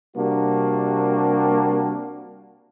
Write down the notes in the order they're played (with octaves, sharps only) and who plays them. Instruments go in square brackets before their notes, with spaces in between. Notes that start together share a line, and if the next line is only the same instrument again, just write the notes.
[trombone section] C3 G3 A#3 D4 F#4